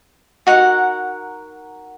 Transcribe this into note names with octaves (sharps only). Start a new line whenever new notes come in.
D#4 F#4 A#4 F#5